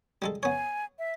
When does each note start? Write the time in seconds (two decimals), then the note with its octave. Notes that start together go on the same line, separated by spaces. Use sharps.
0.22 G3 G#3 A4
0.43 B3 C#5 G#5
0.99 E5